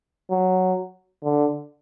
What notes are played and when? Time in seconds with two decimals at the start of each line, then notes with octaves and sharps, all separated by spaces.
0.31 F#3
1.24 D3